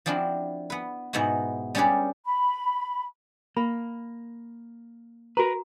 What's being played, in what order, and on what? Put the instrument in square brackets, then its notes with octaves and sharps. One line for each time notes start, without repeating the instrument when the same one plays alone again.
[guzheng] F3 C4 D4 E4 F#4
B3 B4
G#2 B2 B3 D#4 E4 F#4
G3 C#4 D4 G#4 B4 D5
[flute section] B5
[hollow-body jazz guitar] A#3 [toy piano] B5
[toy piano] F#4 A#5 [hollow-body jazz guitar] A#4 B4